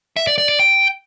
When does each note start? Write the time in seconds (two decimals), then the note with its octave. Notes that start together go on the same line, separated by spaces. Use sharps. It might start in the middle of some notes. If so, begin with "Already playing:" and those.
0.17 E5
0.27 D5
0.38 D5
0.49 D5
0.59 G5